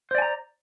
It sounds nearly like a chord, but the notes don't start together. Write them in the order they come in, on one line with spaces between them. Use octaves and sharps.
C5 D5 G#5 A#5